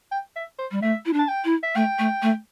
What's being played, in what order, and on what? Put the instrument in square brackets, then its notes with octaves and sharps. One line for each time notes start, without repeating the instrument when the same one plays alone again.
[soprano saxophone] G5
E5
C5
[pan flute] G3
[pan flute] A3 [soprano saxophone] E5
[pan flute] E4
D4
[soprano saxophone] A5
G5
[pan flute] E4
[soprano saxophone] E5
[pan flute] A3 [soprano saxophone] G5
[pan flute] A3
A3